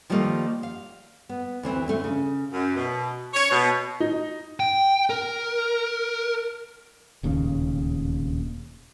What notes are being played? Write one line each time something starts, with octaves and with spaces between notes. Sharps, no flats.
D#3 F3 G3 A3 A#3 D#4
F5
B3
D2 E3 C4
D3 A3
C#3
F#2
B2
C#5
B2
D#4
G5
A#4
D1 D#2 A#2 C#3